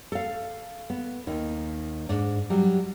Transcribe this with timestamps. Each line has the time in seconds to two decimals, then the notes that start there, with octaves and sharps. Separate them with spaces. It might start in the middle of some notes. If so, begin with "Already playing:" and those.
0.12 A4 F5
0.90 B3
1.27 D#2 D#3
2.09 G#2 D4
2.50 F#3 G3